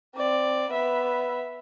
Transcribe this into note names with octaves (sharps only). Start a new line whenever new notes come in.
C4 D5
B3 E5